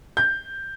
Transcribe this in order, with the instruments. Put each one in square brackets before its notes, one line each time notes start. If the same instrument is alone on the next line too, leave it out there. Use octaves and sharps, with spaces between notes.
[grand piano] G6